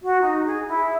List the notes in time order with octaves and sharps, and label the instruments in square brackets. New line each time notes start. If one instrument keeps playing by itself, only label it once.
[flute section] F#4
D#4
G#4
E4